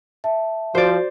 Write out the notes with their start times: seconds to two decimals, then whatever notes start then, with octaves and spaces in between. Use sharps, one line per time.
0.24 E5 A5
0.75 F3 F#4 C5 D5